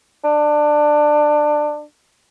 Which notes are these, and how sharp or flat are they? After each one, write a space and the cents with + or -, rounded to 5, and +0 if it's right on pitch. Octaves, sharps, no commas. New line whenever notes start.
D4 +20